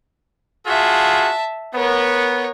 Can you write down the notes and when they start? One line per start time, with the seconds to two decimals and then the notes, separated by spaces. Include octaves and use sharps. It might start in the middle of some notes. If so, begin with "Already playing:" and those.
0.67 F4 F#4 G#4 E5 A5
1.75 B3 A#4 C#5